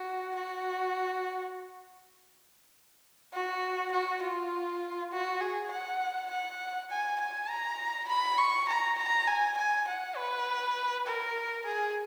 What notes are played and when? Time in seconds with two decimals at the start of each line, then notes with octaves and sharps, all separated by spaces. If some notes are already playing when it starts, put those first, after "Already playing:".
Already playing: F#4
0.36 F#4
3.33 F#4
3.92 F#4
4.22 F4
5.12 F#4
5.41 G#4
5.71 F#5
6.30 F#5
6.91 G#5
7.20 G#5
7.49 A#5
8.09 B5
8.38 C#6
8.69 A#5
8.98 A#5
9.27 G#5
9.57 G#5
9.88 F#5
10.17 B4
11.07 A#4
11.66 G#4